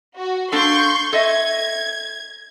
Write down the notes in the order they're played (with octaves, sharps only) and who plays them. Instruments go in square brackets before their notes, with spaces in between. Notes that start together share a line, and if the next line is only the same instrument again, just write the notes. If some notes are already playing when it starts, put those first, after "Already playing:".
[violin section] F#4
[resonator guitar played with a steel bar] A#3 D4 A4 [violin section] C6 C#6 G6
[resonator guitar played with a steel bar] A4 D#5 E5 [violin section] G#6